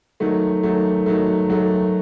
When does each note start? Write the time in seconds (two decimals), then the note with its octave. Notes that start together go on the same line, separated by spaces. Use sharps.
0.20 D#3 F#3 A3
0.63 D#3 F#3 A3
1.06 D#3 F#3 A3
1.49 D#3 F#3 A3